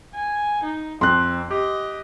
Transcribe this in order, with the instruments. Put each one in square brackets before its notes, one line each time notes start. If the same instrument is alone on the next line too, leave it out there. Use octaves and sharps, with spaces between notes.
[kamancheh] G#5
D#4
[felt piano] F2 [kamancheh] C4 [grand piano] C6 F#6
[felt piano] G4 [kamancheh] D#5